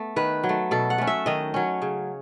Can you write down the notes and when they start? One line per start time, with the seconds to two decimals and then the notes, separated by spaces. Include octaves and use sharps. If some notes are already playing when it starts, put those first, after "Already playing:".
Already playing: A3 B3
0.16 D#3 B4
0.44 F#3
0.49 A3
0.71 B2 A4
0.90 F#5
0.98 A3 C#4
1.07 E5
1.26 D#3 D#5
1.54 F#3 C#4
1.82 C#3